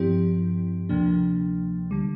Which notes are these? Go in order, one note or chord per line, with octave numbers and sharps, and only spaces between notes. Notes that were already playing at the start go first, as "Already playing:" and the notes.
Already playing: G2 F3 C4 E4 G4
D2 C3 F3 A#3 D4
D3 G3